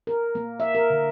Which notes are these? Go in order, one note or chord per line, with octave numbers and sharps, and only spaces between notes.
A#4
A#3
E5
A#4
D3